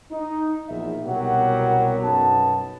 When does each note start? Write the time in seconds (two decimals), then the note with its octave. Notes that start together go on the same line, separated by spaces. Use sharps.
0.12 D#4
0.69 A#1 E2 E5
1.05 C2 B2 F#3 G4 A#4 F#5
2.02 B1 F#2 B3 A5